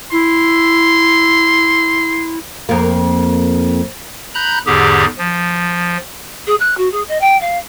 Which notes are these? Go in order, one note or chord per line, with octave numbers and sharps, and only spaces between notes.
E4 C6
F2 A#3
A#5 B5 F#6 G6
E2 G#2 D3 G4 G#4
F3
G#4
F#6
F#4
G#4
D#5
G5
F5